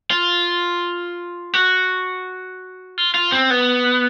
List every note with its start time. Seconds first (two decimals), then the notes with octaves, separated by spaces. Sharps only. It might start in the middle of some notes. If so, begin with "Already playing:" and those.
0.11 F4
1.54 F#4
2.98 F4
3.14 F4
3.32 C4
3.50 B3